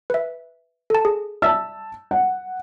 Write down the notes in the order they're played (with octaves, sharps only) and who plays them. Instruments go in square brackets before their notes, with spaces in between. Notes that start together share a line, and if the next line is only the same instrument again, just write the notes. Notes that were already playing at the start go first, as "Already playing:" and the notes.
[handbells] B4 E5
A4 A5
G#4
[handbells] D5 E5 [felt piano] A5 E6
[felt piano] F#5